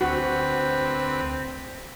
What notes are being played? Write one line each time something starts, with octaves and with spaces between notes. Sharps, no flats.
D2 C4 F#4 B4